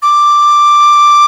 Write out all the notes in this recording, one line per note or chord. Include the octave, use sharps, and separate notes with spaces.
D6